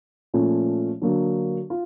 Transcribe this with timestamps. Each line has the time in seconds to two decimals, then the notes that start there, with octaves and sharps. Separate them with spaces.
0.34 A#2 F3 A3 C#4
1.02 D3 F#3 A#3
1.70 F4